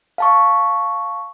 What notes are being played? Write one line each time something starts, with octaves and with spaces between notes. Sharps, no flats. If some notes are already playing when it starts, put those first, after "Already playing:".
F5 A5 C#6